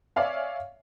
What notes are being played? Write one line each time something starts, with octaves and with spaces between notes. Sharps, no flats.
C#5 D5 E5 F5 G#5